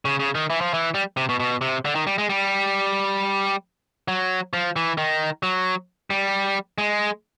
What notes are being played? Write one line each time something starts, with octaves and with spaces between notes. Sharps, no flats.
C#3
C#3
D#3
E3
F3
E3
G3
C3
B2
B2
C3
D3
D#3
G3
G#3
G3
F#3
F3
E3
D#3
F#3
G3
G#3